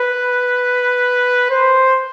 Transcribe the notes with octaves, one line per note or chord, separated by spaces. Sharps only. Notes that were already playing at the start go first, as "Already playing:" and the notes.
Already playing: B4
C5